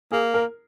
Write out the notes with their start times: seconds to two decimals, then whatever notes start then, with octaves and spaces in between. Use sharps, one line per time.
0.12 A#3 G#4
0.34 A#4